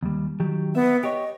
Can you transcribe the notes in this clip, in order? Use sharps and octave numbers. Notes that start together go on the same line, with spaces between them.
D#2 G3
D#3 F#3 G4
B3 E5
G4 C#5 D#5